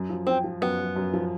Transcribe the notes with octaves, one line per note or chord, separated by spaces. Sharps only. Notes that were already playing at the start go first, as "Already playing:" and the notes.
Already playing: F#2
F3
F3 C4
F3
F#2 B3
F#2
F#2
F3